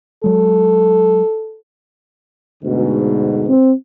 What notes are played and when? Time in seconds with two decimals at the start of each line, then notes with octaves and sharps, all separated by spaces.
0.24 F#3 G#3 A4
2.63 D2 G#2 B2
3.49 C4